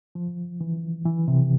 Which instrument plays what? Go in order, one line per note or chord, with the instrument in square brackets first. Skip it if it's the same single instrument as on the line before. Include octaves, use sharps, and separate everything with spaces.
[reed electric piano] F3
E3
E3
C3